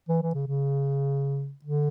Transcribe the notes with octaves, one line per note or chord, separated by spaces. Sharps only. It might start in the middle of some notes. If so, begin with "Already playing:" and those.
E3
E3
C#3
C#3
D3